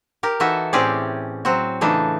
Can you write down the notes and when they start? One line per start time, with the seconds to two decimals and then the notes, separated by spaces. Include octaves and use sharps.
0.23 G4 A#4
0.40 E3 D#4 E4 F#4 A4 E5
0.73 A2 C4 C#4 G4 G#4 D5
1.45 F#3 C4 F#4
1.81 C#3 E3 A3 D4 D#4